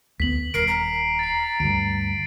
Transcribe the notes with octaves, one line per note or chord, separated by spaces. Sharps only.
D2 B3 B6 F#7
D#1 A#4 C7 D7
A#5
A6 C7
D2 G2 D7